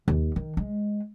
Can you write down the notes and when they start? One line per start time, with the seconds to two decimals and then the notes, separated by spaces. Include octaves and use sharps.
0.08 D#2
0.36 D#3
0.57 G#3